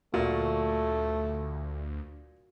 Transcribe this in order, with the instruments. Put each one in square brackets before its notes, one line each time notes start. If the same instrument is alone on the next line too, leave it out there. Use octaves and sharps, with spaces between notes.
[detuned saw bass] D2 [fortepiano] A#2 [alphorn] A3 [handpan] F#4